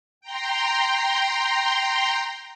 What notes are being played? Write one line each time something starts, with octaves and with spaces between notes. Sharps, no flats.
G5 A#5 C6